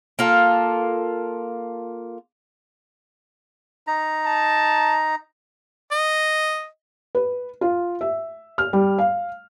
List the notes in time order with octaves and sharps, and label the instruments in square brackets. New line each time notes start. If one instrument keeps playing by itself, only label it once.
[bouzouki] A#3 F4 A4
[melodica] D#4 A#5
[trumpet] A5
[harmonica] D#5
[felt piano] B4
F4
E5
F6
G3
F5